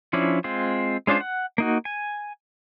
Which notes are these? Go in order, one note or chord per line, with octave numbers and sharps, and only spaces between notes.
F3 C#4 D4 E4
G#3 C4 F4
G#3 C#4 D4 F4 C5
F#5
A#3 D#4 F#4
G#5